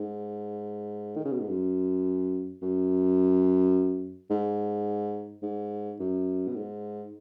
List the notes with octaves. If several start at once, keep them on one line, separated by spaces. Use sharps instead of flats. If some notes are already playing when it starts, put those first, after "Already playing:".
Already playing: G#2
D#3
C#3
B2
G#2
F#2
F#2
G#2
G#2
F#2
B2
G#2